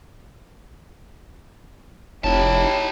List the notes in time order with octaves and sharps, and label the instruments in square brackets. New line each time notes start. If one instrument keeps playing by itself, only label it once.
[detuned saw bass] F1 [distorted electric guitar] D#4 A5 [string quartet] E4 G4 [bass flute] C#5